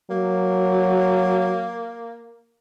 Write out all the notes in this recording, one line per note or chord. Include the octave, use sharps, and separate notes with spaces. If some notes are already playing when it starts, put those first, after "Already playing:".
F#3 A#3